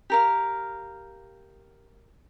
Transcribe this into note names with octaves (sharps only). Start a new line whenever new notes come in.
G4 A#4 F5